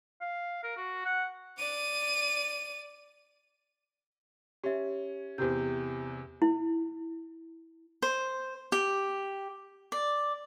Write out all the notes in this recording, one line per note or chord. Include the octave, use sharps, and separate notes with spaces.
F5
A#4
F#4
F#5
D5 D#7
C#4 G4 E5
E2 C3 G4 G6
E4
C5
G4
D5